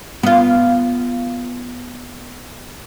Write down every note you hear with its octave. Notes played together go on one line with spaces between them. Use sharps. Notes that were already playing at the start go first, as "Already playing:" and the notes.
B3 F4